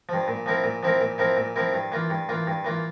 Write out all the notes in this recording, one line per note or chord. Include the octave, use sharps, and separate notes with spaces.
G2 F3
A#2
F3 C4 E4 A#4
A#2
F3 C4 E4 A#4
A#2
F3 C4 E4 A#4
A#2
F3 C4 E4 A#4
G2
E3 A#3 F4
G2
E3 A#3 F4
G2
E3 A#3 F4